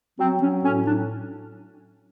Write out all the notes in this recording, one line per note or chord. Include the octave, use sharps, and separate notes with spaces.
F#3 C4
F#3 C#4
A2 C#4
F#3 D4